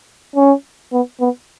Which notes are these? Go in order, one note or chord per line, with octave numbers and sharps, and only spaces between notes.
C#4
B3
B3